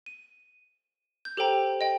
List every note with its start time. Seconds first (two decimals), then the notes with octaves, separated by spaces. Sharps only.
0.06 D#7
1.25 G6
1.37 G4 A4 C5 G5 A#5
1.81 D#5 G5